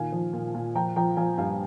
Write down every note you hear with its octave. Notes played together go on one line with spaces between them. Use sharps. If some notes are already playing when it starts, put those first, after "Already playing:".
Already playing: A#2 D#3 F5 G#5
F3
A#2
A#2
F3 G5 A#5
F3 G5 A#5
F3 F5 G#5
G2 F5 G#5